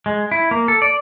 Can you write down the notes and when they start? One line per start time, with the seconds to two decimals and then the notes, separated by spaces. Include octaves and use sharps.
0.06 G#3
0.31 E4
0.51 A#3
0.68 A4
0.82 D5